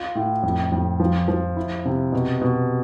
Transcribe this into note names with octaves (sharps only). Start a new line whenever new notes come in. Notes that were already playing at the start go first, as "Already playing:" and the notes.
Already playing: F4
A2
F2
F2
F3
F3
E4
C3
B2
B2